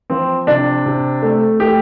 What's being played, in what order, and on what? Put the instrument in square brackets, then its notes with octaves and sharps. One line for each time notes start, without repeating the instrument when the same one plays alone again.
[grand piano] F3 C4
C3 D4
C3
A3
A3 G4